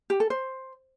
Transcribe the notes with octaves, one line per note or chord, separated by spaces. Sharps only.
G4
A4
C5